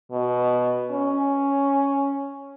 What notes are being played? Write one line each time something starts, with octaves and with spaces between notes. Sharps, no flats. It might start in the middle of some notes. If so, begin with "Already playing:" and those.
B2
C#4